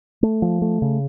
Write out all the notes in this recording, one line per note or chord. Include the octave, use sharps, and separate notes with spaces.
A3
F3
A3
C#3